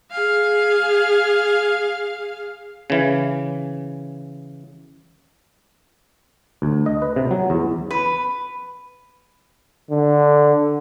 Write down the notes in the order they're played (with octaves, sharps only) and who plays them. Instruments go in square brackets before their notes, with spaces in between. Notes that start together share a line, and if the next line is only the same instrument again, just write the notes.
[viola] G#4 F5
[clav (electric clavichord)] C#3 E3
D2
D#5
B4
C3
F#3
E2
[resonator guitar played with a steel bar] B4
[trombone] D3